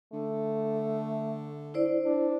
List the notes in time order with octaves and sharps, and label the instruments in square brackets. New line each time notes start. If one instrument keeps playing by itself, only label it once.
[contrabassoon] D3 [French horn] A3
[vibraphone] E4 C5 D5
[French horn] D4